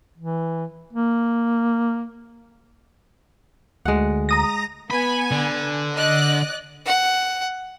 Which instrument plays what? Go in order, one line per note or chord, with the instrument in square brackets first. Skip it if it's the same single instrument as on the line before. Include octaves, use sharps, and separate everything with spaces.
[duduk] E3
A#3
[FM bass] D2 [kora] G#3 F#5
[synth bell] A#5 D#6 A#6
[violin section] B3 G#5 [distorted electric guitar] B5
[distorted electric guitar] D3
[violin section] D5 D#5 F#6
[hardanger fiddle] F#5